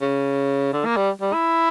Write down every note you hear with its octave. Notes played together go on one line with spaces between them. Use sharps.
C#3
D3
A#3
G3
G3
E4